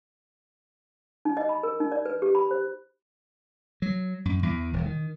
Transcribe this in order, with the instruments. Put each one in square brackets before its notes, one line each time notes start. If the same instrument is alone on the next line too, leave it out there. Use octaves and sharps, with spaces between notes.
[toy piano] D#4
D#5
B5
A#4
D#4
D5
B4
G4
B5
C5
[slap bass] F#3
F#2
E2
D#1
D#3